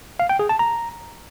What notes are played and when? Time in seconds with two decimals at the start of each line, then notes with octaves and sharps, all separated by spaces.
0.20 F5
0.29 G5
0.39 G#4
0.49 A5
0.59 A#5